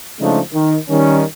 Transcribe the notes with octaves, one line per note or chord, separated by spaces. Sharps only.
C#3 F3 G#3 A3 D4 D#4
D#3
D#3 G3 C#4